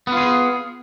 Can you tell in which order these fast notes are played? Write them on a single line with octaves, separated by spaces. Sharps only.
B3 F4 G#4